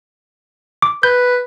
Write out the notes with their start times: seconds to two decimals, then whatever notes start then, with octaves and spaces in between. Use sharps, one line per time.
0.82 D6
1.03 B4 G6